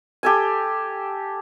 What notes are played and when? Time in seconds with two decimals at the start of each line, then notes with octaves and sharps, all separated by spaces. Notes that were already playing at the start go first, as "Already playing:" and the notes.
0.23 G4 A4 G#5